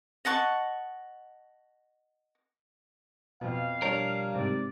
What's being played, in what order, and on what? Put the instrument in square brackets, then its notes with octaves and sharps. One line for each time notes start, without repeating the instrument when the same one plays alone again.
[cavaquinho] D#5 F#5 A5 C#6
[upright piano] F2 [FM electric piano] B2 F3 [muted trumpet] F5
[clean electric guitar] G3 A#4 [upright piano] D4 C#5
[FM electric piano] G#2 C3 [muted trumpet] D5